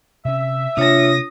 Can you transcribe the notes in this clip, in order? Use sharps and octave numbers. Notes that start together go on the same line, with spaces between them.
C3 C#4 E5
C3 A#3 D4 F4 C#5 D#6 A#6